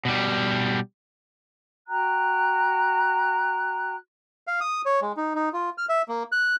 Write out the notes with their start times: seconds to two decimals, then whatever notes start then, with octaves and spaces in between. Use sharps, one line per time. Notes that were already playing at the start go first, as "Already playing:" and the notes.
0.05 B2 G3
1.87 F#4 G5 A#5 F#6
4.47 F5
4.60 D#6
4.86 C#5
5.02 G#3
5.17 D#4
5.35 D#4
5.53 F4
5.78 F6
5.89 E5
6.08 A#3
6.32 F#6